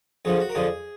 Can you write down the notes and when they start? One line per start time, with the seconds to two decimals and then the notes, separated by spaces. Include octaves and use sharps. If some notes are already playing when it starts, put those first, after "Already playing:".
0.25 F2 D3 F3 G#4
0.40 F#4
0.49 A#4
0.55 F2 D3 F3 G#4